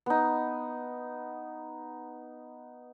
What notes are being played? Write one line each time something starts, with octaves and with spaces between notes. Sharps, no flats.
B3 D#4